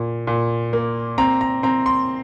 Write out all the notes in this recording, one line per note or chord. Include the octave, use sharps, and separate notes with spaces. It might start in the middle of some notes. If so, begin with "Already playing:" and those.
Already playing: A#2
A#2
A#3
C4 A#5
A#5
C4 A#5
C6